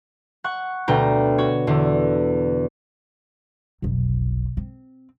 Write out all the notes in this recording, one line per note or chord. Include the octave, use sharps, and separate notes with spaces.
F#5 C#6
D2 B2 G5 A#5
F#4 C#5
E2 D3
F1 B1
C4